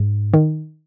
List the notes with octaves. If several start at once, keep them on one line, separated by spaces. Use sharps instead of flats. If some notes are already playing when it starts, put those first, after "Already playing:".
Already playing: G#2
D#3